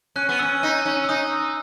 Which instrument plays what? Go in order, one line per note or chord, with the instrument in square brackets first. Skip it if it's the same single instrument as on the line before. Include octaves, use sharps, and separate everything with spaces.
[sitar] C#4 [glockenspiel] F#6
[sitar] B3
[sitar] C#4 [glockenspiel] E6
[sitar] D#4
C#4
[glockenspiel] E6
[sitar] D#4 [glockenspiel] D#6